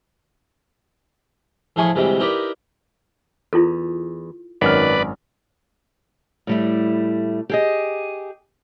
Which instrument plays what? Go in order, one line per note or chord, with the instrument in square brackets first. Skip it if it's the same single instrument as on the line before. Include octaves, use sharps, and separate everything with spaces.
[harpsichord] A2 F3 E4 G#4 G#5 C#6
D2 C3 E3 G3 G#3
D#4 E4 G4 A#4 B4 D5
[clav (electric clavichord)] E2 [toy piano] E4 F4 A4
[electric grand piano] G#1 F#2 F6 [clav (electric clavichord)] D#3 F#3 [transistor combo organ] B4 D5
[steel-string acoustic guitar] A2 G3 A3
G4 G#4 D#5